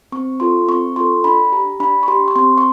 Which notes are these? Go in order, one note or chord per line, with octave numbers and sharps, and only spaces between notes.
C4 C#6
F4 A4 C6
C4 C#6
F4 A4 C6
D4 B5
G4 A#5
D4 B5
C#6
G4 C6
C#6
C4 C6
C#6